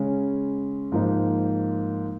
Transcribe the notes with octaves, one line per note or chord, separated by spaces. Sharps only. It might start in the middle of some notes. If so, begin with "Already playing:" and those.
Already playing: C#3 G#3 C#4
G#2 F3 A#3 D#4